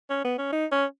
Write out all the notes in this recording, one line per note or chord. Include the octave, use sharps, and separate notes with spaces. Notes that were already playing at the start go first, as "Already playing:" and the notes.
C#4
B3
C#4
D#4
C#4